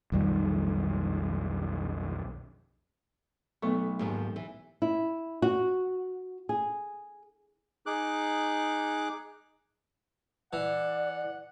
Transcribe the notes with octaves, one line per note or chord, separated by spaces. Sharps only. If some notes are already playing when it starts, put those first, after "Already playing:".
B1 F2 D#3 G3
B1 A3 B3 C#6
D#2 G#2 F3
E3
E4
F#4
G#4
D#4 G#4 D6 F#6
E3 D5 F#5